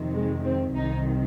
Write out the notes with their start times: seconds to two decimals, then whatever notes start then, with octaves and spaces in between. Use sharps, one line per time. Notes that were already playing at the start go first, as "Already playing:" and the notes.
Already playing: F2 C3 D#3
0.14 G#3
0.44 C4
0.74 C2 C3 D#3 D#4